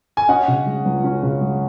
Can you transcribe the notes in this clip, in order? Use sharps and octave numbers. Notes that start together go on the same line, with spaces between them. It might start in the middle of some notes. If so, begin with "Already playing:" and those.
G#5
C#4 D#5 F#5
C#3
G#3
C#2
C#4
C#3
G#3